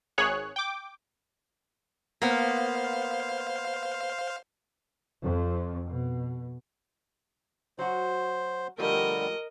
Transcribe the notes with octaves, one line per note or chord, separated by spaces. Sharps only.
G#1 G#4 C#5 F#6
G5 D6
A#3 B3 C5 F5
F2
B2
F#3 F#4 C5
D3 F3 G3 A3 G4 A#4 D#5